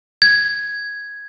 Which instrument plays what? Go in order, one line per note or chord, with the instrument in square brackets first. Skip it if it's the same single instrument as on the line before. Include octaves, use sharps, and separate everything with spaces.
[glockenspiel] G#6